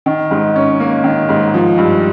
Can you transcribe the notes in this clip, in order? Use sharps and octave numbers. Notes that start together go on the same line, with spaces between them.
D#3
G#2
C#4
A#3
D#3
G#2
F3
G2